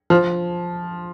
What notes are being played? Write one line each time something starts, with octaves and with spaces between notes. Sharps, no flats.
F3